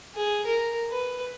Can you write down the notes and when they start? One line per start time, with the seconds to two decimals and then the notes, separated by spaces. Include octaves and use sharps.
0.15 G#4
0.46 A#4
0.92 B4